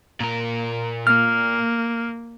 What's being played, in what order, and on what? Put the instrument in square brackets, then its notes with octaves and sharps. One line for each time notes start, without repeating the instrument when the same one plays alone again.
[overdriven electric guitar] A#2 A#4
[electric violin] A#3 [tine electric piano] F6